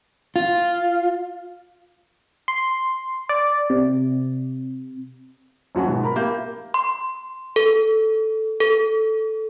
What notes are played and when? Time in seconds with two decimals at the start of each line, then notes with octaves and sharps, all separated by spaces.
0.36 F4
2.48 C6
3.29 D5
3.70 C3
5.75 D#1 F#2 F#4 F#5 G#5
5.87 G#2 B2
6.03 A#4 A#5 B5
6.16 A#3 G4 E5 G6
6.74 C6
7.56 A4
8.60 A4